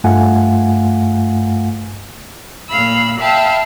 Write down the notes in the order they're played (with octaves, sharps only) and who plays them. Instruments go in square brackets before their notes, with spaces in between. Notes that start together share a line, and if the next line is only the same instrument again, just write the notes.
[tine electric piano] G2 A3 F4 F5 F#5 G#5
[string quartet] A#2 F5 B5 E6
E5 F5 G5 A5 B5